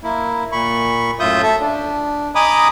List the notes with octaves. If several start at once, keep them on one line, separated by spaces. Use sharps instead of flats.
A#3 E4
A#2 B5 C#6
F#2 A2 F4 E5 D#6 G6
A4 E5
D4
D#5 G#5 A#5 B5 D6 D#6